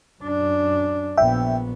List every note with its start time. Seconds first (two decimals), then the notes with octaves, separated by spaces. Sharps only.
0.22 F#2 D4
1.17 A#1 B3 E5 G5